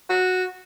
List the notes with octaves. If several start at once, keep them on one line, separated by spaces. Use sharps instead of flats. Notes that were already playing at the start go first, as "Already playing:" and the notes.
F#4